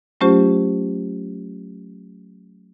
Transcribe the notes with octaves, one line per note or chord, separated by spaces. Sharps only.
F#3 A3 C#4 F4 G4 C5